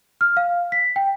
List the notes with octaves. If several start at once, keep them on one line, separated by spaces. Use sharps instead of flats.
F6
F5
B6
G5